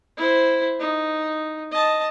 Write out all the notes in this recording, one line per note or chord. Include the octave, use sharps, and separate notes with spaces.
E4 C5
D#4
D#5 A5